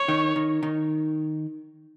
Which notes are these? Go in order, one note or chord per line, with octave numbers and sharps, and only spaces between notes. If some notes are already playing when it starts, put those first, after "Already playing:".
Already playing: C#5
D#3
D#3
D#3